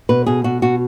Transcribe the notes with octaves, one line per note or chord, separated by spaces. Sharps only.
B2 B4
B2 G#4
B2 F#4
B2 F#4